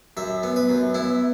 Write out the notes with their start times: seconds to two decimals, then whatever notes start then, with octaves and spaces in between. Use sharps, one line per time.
0.17 F#2 E5
0.43 B3
0.56 B4
0.70 F#2
0.95 B3 E4